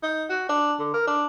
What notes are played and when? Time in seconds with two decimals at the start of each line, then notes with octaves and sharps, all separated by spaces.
0.03 D#4
0.30 F#4
0.49 D4
0.79 D3
0.94 A#4
1.07 D4